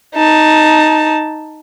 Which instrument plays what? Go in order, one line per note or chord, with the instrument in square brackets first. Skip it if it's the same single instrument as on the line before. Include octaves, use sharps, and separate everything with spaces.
[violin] D#4 A5